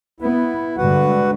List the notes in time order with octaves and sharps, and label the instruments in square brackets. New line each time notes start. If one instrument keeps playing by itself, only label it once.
[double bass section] B3 [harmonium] E4
[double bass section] G2 D3 G#3 [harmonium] F#4 B4 F#5